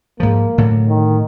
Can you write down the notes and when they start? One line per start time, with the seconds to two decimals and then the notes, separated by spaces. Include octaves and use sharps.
0.20 G#2 F3 A#3
0.58 A2 D3 F#3
0.89 D#3